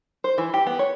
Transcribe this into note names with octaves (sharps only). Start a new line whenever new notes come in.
C5
E3
G4
B3
C#5